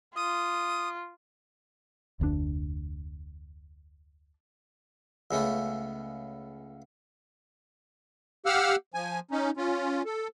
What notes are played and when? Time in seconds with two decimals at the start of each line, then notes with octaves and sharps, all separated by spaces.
0.16 F4 D#6
2.20 F1 D2 G#2 D4
5.31 C#2 C#3 A3 B3
8.46 G4 F5 F#5 E6 F6
8.94 F3 G#5
9.31 C#4 D#4
9.57 C#4 F4
10.06 A4